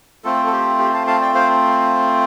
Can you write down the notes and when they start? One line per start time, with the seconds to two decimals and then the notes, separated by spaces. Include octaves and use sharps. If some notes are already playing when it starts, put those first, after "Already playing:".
0.24 A3 C4 F4 A4
0.47 A4
0.52 G4
0.79 G4
0.94 F5 A5
1.07 F5 A5
1.21 D5 G5
1.35 C5 F5